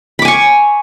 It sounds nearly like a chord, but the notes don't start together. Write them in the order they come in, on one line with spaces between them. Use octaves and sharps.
B5 D6 G#5 C#6